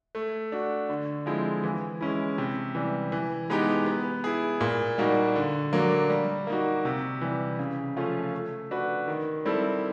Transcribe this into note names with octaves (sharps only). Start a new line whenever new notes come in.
A3
D4 F#4
D3
F3 G#3 C4 E4
E3
G#3 C#4 E4
C3
E3 G3
E3
G#3 B3 D#4 G4
B3
E4 G#4
A#2
G3 A#3 D#4 F#4
D3
F#3 A#3 D4
G3
A#3 D#4 F#4
C3
E3 G3
C#3
F3 A3 C#4 F4
A3
D4 F#4 B4
D#3
G3 C4 E4 A4